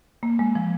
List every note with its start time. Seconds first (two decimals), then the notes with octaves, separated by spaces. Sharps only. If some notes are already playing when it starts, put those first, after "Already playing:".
0.23 A#3
0.39 G#3
0.55 F3